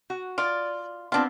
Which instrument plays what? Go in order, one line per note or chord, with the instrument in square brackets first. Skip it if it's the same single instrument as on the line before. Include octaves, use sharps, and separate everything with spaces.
[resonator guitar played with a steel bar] F#4
[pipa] F4 [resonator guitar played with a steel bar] D5
[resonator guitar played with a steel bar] B3 C4 [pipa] D4 F4